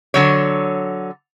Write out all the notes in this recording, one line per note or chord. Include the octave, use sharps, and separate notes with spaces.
D3 F#3 C#5